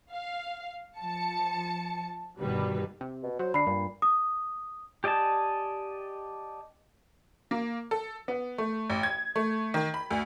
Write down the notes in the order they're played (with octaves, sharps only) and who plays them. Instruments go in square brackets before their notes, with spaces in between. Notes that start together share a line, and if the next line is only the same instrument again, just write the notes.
[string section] F5
F3 A5 C#7
G1 B2 D#3 G3 B4
[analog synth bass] C3
[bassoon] B2
[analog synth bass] F#3 [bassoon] C5
[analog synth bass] D3 [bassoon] D4 [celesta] B5 C7
[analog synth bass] G2 [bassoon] A#2
[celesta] D#6
[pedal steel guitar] G4 D5 D#5 G#5 A5
[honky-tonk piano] A#3
A4
B3
A3
A1
G#6
A3
D#3
B5
D2